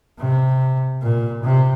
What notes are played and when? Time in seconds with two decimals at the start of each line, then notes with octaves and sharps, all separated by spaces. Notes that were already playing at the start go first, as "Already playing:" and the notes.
0.18 C3
1.02 A#2
1.43 C3